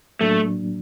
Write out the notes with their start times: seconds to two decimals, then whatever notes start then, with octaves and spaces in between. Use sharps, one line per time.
0.21 A2 F#3 A3 A#3 D4